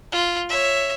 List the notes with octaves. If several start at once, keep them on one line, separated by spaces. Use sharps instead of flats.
F4
C#5 E5